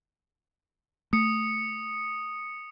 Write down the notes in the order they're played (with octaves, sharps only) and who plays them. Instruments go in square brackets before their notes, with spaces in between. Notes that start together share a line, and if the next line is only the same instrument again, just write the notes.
[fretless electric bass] A3 [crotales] D#6 C#7